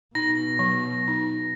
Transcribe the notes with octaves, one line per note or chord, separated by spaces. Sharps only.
B2 D#4 A#6
F#3
D#4